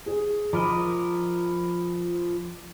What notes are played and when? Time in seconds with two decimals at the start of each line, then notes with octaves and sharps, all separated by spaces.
0.06 G#4
0.53 F3 A#4 D#5 B5 D6